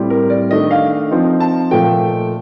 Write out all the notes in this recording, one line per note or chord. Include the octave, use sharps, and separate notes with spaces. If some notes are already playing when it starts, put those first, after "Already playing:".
Already playing: A2 G3 C4
A#4
D5
D#3 A3 D4 D#5
F5
F3 C4 D#4
A5
A#2 F3 A3 G5